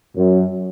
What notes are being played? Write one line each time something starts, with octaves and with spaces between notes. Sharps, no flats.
F#2